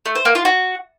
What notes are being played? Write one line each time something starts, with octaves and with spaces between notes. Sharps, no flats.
A3
C5
A#3
F4
F#4